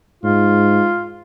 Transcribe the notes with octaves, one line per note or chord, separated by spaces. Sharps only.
G#2 F4